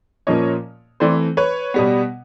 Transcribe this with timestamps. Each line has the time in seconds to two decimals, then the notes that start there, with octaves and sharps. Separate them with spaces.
0.27 A#2 F3 A#3 C#4 C#5 D#5
1.00 E3 A3 C4 C5 D5
1.37 B4 C#5
1.74 B2 G3 B3